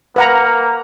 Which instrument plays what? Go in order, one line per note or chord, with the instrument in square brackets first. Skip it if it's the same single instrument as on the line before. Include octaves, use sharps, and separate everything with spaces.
[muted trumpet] A#3 [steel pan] B4 F#5 A#5